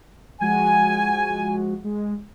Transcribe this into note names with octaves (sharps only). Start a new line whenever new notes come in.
F3 G#3 F#4 G#5
G#3